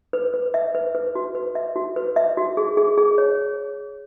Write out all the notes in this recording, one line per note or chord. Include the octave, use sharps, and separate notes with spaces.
B4
B4
E5
B4
B4
F#4
B4
E5
F#4
B4
E5
F#4
G#4
G#4
G#4
C#5